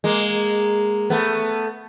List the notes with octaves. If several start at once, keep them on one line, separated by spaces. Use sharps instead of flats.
G#3 A#3
A3 B3